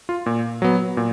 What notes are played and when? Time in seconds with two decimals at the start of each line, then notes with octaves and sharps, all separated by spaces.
0.09 F4
0.26 A#2
0.62 F#3 B3
0.97 A#2